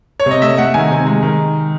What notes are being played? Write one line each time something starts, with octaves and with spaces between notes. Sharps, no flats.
C#5
C3 D#5
A3 E5
A3 F#5
D#3 G#5
C3
G#3
D#3